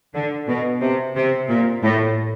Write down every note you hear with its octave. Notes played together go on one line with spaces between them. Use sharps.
D3
B2
C3
C3
A#2
A2